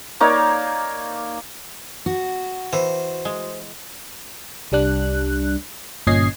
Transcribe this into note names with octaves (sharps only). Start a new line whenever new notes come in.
A#3 D#4 C#5 D5
F#4
E3 C5
G#3
C2 G3 D4 F#6
G1 A#2 C#4 D#5 G#6 C7